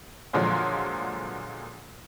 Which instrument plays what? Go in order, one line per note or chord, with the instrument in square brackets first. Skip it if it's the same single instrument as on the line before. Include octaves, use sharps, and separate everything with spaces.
[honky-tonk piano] A#2 D3 F3 F#3 G#3